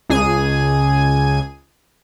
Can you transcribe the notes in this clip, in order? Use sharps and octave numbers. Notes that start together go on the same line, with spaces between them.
C#2 G#4 G#5 D#7